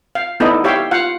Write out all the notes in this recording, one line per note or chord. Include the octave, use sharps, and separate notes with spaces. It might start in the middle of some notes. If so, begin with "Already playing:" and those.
F5
B3 D#4 E4 A4 D5 D#5
G4 C#5 E5 F5 G5
F4 F5 F#5